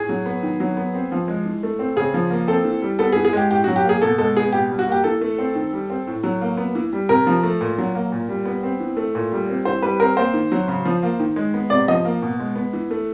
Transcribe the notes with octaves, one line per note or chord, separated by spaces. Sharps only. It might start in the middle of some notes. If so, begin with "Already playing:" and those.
Already playing: A2 G#4
F#3
B3
D#3
F#3
B3
C4
F3
G#3
E3
A3
C4
C#3 G#4
F3
A#3
C4 A4
E3
G3
B3 A4
G#4
E3
G#4
G#3 G4
A2 G4
F#3 F#4
G4
A#3 G#4
B2 A4
G#3 A4
B3 G#4
B2 G4
G3
F#4
A#3 G4
E3 A4
A3
C4
D#3
G3
C4
A2
F#3
A#3
B3
E3
G3
C3 A#4
F3
A3
A#2
F#3
A#3
A#2
G3
B3
C4
E3
A3
A#2
G3
C4
E3 C5
G3 B4
C4 A#4
A#3 C5
D#3
F#3
C#3
F3
A#3
D#3
G#3
B3
C3 D5
F3 D#5
A#3
B2
G#3
B3
E3
A3